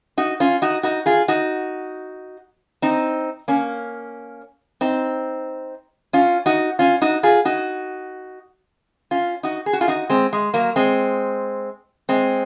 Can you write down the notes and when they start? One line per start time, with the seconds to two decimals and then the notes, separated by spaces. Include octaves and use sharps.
0.18 D#4 F#4
0.40 C#4 F4
0.62 D#4 F#4
0.83 D#4 F#4
1.06 F4 G#4
1.28 D#4 F#4
2.82 C4 D#4
3.48 A#3 C#4
4.81 C4 D#4
6.13 C#4 F4
6.46 D#4 F#4
6.79 C#4 F4
7.02 D#4 F#4
7.23 F4 G#4
7.45 D#4 F#4
9.11 C#4 F4
9.43 D#4 F#4
9.66 G#4
9.73 F#4
9.81 F4 G#4
9.88 D#4 F#4
10.10 G#3 C4
10.33 G#3
10.54 F#3 A#3
10.76 G#3 C4
12.09 G#3 C4